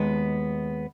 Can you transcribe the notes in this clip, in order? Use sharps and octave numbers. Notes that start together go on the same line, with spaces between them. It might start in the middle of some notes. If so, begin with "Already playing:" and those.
Already playing: D#2 G#3 B3